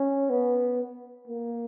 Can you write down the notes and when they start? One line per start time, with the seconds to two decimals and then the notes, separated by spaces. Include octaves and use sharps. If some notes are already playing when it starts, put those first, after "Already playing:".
Already playing: C#4
0.30 B3
1.28 A#3